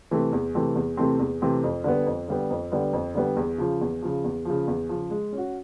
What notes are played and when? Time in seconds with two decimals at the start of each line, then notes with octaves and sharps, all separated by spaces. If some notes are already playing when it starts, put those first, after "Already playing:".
0.11 C3 E3 A3 C4
0.33 E2
0.55 C3 E3 A3 C4
0.76 E2
0.97 C3 E3 A3 C4
1.19 E2
1.42 C3 E3 A3 C4
1.64 F2
1.84 D3 G3 B3
2.07 F2
2.28 D3 G3 B3
2.50 F2
2.72 D3 G3 B3
2.93 F2
3.15 D3 G3 B3
3.37 E2
3.58 C#3 F3
3.81 E2
4.02 C#3 F3
4.24 E2
4.45 C#3 F3
4.68 E2
4.89 C#3 F3
5.10 G#3
5.33 C#4 F#4